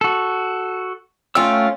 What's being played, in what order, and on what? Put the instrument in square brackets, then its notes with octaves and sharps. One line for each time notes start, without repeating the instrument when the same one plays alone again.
[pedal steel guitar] F#4 A4
[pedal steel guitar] A3 G5 E6 [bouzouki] C#4 F4